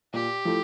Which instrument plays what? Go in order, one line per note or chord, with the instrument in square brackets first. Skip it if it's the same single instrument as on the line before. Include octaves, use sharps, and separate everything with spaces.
[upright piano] A#2 [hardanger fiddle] G4
[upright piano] F3 A3 E4